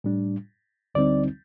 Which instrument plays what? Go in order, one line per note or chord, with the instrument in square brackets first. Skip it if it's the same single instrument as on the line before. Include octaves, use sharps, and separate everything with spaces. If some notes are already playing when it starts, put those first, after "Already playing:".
[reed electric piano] A2 G3 D4
D2 D3 G3 C4 D#4 D5